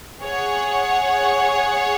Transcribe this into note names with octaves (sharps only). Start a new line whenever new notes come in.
G#4 C#5 F#5